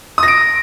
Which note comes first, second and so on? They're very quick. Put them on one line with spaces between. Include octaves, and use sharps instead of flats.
D#6 A#6 D7